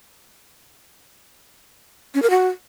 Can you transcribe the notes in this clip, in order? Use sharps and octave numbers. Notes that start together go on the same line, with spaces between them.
C#4
A#4
F#4